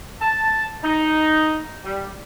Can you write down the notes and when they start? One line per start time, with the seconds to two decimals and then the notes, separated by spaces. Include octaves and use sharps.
0.21 A5
0.84 D#4
1.84 G3